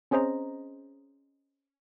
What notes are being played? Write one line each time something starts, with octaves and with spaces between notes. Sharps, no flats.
C4 C#4 G#4 C5 D#5 A#5